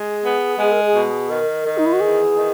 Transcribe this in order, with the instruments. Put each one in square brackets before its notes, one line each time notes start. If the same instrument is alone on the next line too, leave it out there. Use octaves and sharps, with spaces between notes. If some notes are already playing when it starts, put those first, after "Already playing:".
Already playing: [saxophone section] G#3 [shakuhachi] G#4
[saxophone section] B3
[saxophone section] G#3 [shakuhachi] G#4
[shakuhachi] A#4
G#4
[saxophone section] B2
[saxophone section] D#3 [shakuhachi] A#4
[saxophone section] D#3
[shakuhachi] D#4
E4
F#4
[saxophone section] E2 [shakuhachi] G#4
[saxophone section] D#3